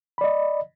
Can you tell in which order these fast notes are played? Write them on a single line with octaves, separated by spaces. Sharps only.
B5 D5 D#5